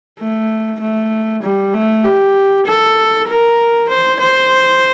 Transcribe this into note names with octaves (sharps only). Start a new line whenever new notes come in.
A3
A3
G3
A3
G4
A4
A#4
C5
C5